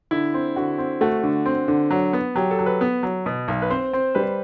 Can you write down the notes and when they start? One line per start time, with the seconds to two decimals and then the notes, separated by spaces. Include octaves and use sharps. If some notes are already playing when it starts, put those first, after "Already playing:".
0.11 D3 E4
0.34 C4
0.56 D3 F#4
0.78 C4
1.01 A3 F#4
1.23 D3
1.46 C4
1.68 D3
1.91 F#3
2.13 B3
2.36 F#3 G4
2.51 A4
2.59 F#3
2.66 B4
2.81 B3
3.03 F#3
3.26 B2
3.48 B1
3.62 B4
3.70 C4 C5
3.93 C4
4.15 G3 B4
4.23 C5